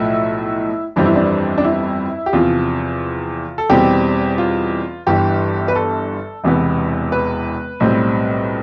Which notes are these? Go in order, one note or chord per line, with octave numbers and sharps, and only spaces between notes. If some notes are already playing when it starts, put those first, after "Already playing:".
Already playing: B1 A2 F3 A3 E4
G1 F2 E3 G3 C4 D4
E4
D4
D4
E4
G4
E2 C3 F3 F4
A4
E2 B2 G3 C4 G4
F4
G1 G2 E3 G4
B4
A4
E1 E2 C3 E3 B3
B4
B1 A2 G3 C4